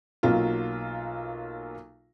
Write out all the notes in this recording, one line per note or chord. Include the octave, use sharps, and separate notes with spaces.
B1 F#3 A#3 F4